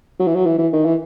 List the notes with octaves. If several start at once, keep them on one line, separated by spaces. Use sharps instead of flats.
F#3
E3
F#3
E3
E3
D#3
E3